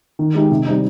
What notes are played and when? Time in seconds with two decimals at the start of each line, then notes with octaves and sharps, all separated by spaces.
0.19 D#3
0.35 G#3 D#4 G4
0.51 C3
0.66 G3 C4 D#4